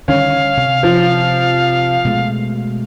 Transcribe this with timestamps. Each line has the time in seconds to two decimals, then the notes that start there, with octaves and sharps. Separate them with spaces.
0.08 D3 D#3 G3 C#4 F5
0.57 C3
0.83 F3
2.05 B2 G#3 A3